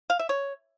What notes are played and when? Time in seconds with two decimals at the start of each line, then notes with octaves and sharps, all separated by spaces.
0.10 F5
0.19 E5
0.29 C#5